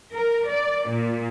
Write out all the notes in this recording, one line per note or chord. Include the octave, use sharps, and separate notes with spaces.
A#4
D5
A#2